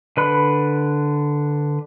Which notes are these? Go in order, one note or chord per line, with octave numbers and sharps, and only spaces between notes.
D3 B4 B5